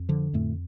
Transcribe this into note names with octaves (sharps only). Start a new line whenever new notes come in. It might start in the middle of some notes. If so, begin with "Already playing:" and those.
Already playing: F2
D3 F3
F2 A2 A3